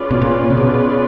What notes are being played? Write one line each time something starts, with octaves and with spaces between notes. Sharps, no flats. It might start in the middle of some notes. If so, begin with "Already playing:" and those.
Already playing: C#4 F4 G#4 B4 D5
B2
A#2
C3
B2